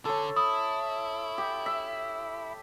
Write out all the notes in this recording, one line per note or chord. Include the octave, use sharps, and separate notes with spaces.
D3 A4 C#5
E4 D#6
G4
E5